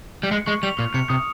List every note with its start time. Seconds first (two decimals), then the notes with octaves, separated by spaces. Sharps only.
0.23 G3
0.31 G#3 C#7
0.47 G#3 C#6
0.63 G3 F7
0.78 A#2 F6
0.94 C3 C#7
1.09 C3 D#6